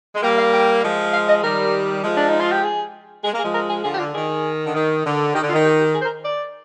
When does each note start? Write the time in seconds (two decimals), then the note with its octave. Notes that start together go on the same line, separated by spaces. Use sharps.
0.15 G#3
0.23 G3 A#3 G5
0.38 F5
0.53 G5
0.84 F3 G#3
1.13 F5
1.29 D#5
1.43 D#3 G3 A#4
2.04 F3 G#3
2.17 D4
2.28 D#4
2.40 F4
2.52 G4
2.64 G#4
3.24 G#3 G#4
3.33 A#3
3.39 G#4
3.43 F3 G#3
3.54 A#4
3.69 G#4
3.84 D3 F3 G#4
3.94 G4
3.99 D3 F4
4.14 D#3 G#4
4.65 D3
4.75 D#3
5.05 D3
5.35 D#3 G4
5.43 D3
5.49 F4
5.53 D#3
5.65 G4
5.80 G4
5.95 G#4
6.01 C5
6.05 A#4
6.24 D5